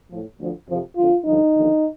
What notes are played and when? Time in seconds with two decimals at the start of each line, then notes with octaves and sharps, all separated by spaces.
0.09 A2 F3
0.38 D2 D3 F3
0.67 F2 C3 F3
0.96 F2 D3 F3 F4
1.25 G2 D3 F3 D#4
1.55 D#2 D3 F3